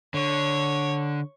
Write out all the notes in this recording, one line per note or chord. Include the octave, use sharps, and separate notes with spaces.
D3 C#5